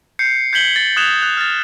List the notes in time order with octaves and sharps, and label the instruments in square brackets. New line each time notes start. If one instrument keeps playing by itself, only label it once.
[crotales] G6 C7 C#7
G6 G#6 B6 C#7 F#7 G7
A6
D#6 F#6 G#6 E7 F7 G7
F#6
F6 A6